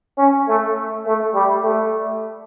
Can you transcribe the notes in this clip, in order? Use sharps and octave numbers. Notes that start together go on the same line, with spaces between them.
C#4
A3
A3
G3
A3